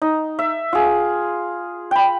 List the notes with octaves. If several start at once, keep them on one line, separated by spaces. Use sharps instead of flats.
D#4
E5
F4 G#4
G5 B5